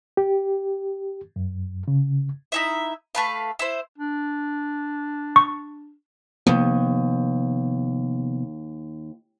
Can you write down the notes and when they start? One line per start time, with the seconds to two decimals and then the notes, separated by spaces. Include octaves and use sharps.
0.17 G4
1.36 F#2
1.88 C#3
2.52 D#4 E4 E5
3.15 A3 B4 F5
3.59 E4 C5
3.98 D4
5.36 C#6
6.47 D#2 C3 F3 B3